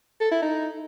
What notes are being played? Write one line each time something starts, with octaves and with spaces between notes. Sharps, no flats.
A4
E4
D#4